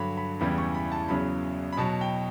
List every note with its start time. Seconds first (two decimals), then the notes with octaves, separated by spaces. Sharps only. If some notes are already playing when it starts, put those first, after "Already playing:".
Already playing: G2 D3 F#3 B5
0.17 B5
0.40 E2 C#3 E3 G3 B5
0.58 C#6
0.75 B5
0.92 A5
1.09 E2 C#3 F#3 B5
1.73 B5
1.77 B2 F#3 A5
2.01 G5